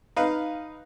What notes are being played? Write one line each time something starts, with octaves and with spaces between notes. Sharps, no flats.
D#4 B4 F5